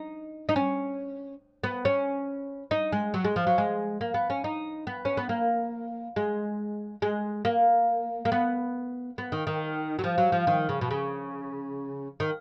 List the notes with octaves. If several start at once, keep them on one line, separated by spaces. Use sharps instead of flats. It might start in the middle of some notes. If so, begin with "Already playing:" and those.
Already playing: D#4
D#4
C#4
B3
C#4
D#4
G#3
F#3
G#3
F3
F#3
G#3
A#3
B3
C#4
D#4
B3
C#4
B3
A#3
G#3
G#3
A#3
A#3
B3
B3
D#3
D#3
F#3
F3
F#3
F3
D#3
C#3
B2
C#3
D#3